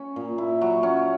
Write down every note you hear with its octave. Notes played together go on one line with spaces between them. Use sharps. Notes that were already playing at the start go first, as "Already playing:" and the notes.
Already playing: C#4
A#2
E4
F#3
C#4